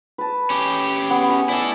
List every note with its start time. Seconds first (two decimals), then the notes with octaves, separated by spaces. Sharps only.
0.18 B4 A5
0.50 C#4 G4
1.10 B3
1.29 D#5 G#5
1.49 E4 A4 D5 D#5